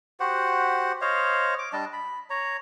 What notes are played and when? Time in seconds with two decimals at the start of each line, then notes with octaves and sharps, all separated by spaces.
0.20 F#4 G4 C5 F#5
1.01 C5 C#5 D#5 F5
1.59 D6
1.73 G3 D4 D#5 A5
1.93 B5
2.30 C#5 A#5